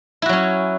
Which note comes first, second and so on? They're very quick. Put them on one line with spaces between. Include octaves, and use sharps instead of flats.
E4 F#4 F#3 C#4